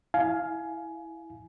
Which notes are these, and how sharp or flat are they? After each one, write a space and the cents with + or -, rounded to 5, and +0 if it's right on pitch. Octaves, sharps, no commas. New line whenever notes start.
E4 -5 F5 +0 G#5 +20